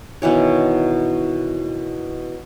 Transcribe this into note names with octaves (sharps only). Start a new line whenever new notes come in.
B2 D#3 E3 C#5